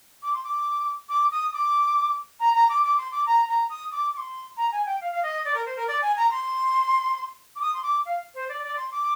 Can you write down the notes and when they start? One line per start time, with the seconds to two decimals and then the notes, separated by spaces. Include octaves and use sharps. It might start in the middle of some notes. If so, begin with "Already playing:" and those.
0.22 D6
0.33 C6
0.44 D6
1.09 D6
1.32 D#6
1.53 D6
2.40 A#5
2.54 A#5
2.69 D6
2.84 D6
2.98 C6
3.12 D6
3.26 A#5
3.49 A#5
3.70 D#6
3.92 D6
4.14 D6
4.17 C6
4.57 A#5
4.72 G#5
4.86 G5
5.01 F5
5.12 F5
5.23 D#5
5.45 D5
5.54 A#4
5.66 C5
5.76 A#4
5.88 D5
6.02 G#5
6.17 A#5
6.31 C6
7.56 D6
7.61 D#6
7.74 C6
7.83 D6
8.05 F5
8.34 C5
8.49 D5
8.63 D5
8.77 C6
8.92 D6